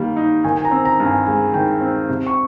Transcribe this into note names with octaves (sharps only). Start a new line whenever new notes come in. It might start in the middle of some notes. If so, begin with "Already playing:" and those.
Already playing: D#3 G3 A#3
D#4
D#3 G#5
G#5
A#5
C4
A#5
G2
G#5
G#3 G#5
D#3 G5
C4
C3
C#6